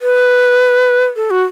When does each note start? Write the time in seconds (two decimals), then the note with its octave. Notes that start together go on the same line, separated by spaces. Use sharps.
0.02 B4
1.16 A4
1.30 F#4